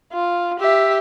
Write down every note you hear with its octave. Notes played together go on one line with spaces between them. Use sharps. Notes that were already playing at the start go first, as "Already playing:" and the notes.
F4
G4 E5